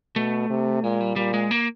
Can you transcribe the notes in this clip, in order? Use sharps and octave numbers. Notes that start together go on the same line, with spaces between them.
B2 A3
C3
A#2 G#3
G3
A#2 G3
G#3
A#3